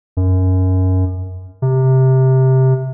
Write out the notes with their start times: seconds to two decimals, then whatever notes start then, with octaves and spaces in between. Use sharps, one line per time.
0.17 F#2
1.62 C3